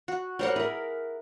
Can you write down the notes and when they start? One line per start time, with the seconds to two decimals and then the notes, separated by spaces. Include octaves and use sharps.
0.08 F#4
0.39 G3 F#4 A#4 C5 C#5 F#5
0.56 E4 G#4 A#4